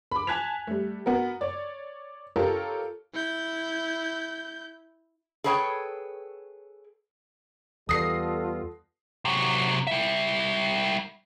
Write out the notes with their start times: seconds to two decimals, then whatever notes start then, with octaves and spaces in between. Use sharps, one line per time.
0.11 B5 D6
0.27 G#5 A5 F#6 G#6 B6 F7
0.67 G3 A3
1.06 B3 F#4 A#4
1.41 C#5 D5
2.36 F4 G4 A4 A#4 C#5
3.13 E4 G6
5.44 G#4 A4 B4 C#5 F5 G5
7.89 E2 G3 B3 F4 A4 D#6 A#6 C7
9.25 C3 F#3
9.87 G3 E5